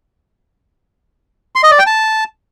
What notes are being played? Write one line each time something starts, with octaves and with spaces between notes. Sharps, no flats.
C6
D#5
D5
G5
A5